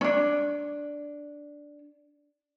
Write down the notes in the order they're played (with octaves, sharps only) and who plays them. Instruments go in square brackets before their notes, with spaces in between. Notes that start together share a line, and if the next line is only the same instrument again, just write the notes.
[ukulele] C#4 D4